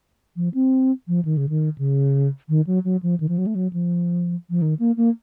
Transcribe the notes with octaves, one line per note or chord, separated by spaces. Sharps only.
F3
C4
F3
D#3
C#3
D#3
C#3
D#3
F#3
F#3
F3
D#3
F3
F#3
A3
F#3
F3
F3
D#3
A#3
A#3